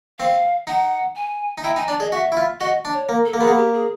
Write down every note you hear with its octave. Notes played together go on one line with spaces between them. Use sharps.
C4 F5
D#4 F#5
G#5
D#4
E4 G5
D#4 G#5
D4 D5
G#4 D#5
F#4 E5
E4
F4
F#4 D#5
D4
C#5
A#3
A4
A#3
B3 G#4
A#3
G4
G#4